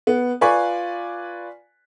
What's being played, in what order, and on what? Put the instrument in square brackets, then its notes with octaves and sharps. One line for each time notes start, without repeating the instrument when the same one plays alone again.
[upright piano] B3
F4 B4 D5 G#5 C#6